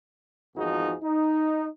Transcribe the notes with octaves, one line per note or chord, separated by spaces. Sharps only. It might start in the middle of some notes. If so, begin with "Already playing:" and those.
G#1 E2 F3 D#4 F#4 G#4
D#4